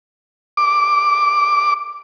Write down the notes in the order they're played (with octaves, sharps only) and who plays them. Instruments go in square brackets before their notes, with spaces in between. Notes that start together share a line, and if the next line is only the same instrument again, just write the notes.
[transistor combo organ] D6